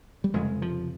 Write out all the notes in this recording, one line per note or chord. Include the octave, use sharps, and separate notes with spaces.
G3
F1 F2 C#3 G#3
F3